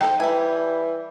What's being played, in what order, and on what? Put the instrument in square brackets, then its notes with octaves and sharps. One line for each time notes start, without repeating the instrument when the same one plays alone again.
[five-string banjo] D#4 A4 C5 [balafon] G5
[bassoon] E3 [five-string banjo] G3 E5 G#5